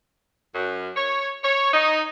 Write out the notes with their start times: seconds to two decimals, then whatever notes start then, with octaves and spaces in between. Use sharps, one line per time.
0.54 F#2
0.96 C#5
1.43 C#5
1.73 D#4